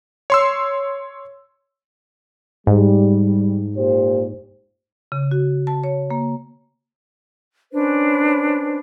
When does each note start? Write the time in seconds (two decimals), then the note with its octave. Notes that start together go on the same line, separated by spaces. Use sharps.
0.30 C#5 C6 E6
2.67 G#2 G3
3.76 A#2 G4 C5
5.12 C#3
5.31 F#4
5.67 A5
5.84 C#5
6.10 A#3
7.72 C#4 D4 B4 C5